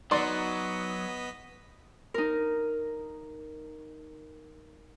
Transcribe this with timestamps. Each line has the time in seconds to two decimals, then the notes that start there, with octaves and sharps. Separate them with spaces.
0.11 F#3 B3 D#4 D5 D#5 C6 B6
2.14 D#4 A#4